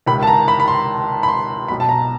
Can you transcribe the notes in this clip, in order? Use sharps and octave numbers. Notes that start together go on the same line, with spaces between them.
C#2 C3 D#3 B5
A5
A#5
B5
B5
C6
B5
C6
B1 B2 B5
A5
A#5